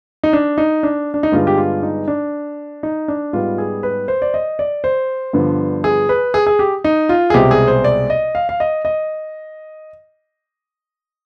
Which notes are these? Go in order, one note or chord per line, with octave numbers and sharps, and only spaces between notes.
D#4
D4
D#4
D4
D4
D#4
G2 D3 G#3 B3 F4
G4
F4
D#4
D4
D#4
D4
G#2 G3 B3 F4
G#4
B4
C5
D5
D#5
D5
C5
G2 D3 F3 B3
G#4
B4
G#4
G#4
G4
D#4
F4
G#4
C2 B2 G#3 C4 G4
G#4
C5
D5
D#5
F5
F5
D#5
D#5